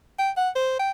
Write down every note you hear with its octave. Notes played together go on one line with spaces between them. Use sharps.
G5
F#5
C5
G5